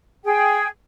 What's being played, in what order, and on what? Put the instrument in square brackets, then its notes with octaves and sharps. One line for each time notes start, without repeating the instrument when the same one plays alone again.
[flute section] G#4 G5